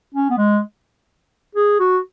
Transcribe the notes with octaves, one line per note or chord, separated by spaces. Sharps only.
C#4
B3
G#3
G#4
F#4